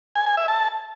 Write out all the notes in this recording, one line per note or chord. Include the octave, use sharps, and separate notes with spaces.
G#5
G#5
E5
A5